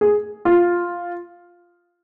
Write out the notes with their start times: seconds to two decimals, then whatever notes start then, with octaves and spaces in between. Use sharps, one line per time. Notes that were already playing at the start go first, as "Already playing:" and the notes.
0.01 G#4
0.45 F4